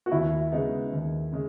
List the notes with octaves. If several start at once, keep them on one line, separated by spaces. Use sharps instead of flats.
F#4
D#2 E4
C#3 G#3 B3 D#4
D#2
C#3 G#3